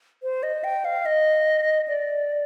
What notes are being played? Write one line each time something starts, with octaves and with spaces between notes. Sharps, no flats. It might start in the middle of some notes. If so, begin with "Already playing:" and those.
C5
D#5
G5
F5
D#5
D5